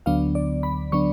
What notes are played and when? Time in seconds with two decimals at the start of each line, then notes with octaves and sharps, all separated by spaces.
0.06 D2 D3 F#3 B3 D4 F5
0.35 D5
0.63 B5
0.92 D3 F#3 B3 D4 C#6